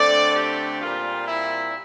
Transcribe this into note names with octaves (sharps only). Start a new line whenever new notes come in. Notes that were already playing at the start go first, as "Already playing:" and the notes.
Already playing: D3 A3 C4 D5
G4
A#2 G3 C4 F4
E4